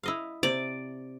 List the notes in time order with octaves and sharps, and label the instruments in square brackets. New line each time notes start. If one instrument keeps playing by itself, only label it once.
[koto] E4 D#5 F5
[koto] C3 [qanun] D5